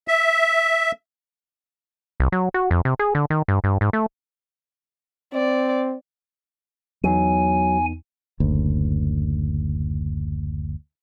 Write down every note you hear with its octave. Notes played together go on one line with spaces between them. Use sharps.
E5
C2
F#3
F#4
F2
C3
G#4
D3
D#3
G2
G2
G#2
A3
C4 D5
E2 F#3 B3 D#4 G#5
F#1 D2